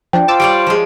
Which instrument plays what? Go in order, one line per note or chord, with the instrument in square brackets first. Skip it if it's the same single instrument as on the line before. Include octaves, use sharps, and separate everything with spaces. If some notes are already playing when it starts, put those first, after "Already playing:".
[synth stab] F3 D4 [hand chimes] G5
[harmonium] F4 C5 [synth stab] A5 D6 E6
[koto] G3 C#5 D5 [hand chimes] D7
[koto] F3 G#3